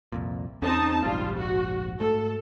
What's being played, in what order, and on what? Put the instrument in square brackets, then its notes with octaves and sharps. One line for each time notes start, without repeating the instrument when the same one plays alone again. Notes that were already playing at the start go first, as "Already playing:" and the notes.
[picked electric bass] C2 F2 A#2
[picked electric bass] E2 C#4 [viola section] C4 D#4 A5
[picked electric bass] F1 A#1 G#2 [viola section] G3 F4
[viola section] F#4
[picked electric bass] G#2 A3 [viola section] A4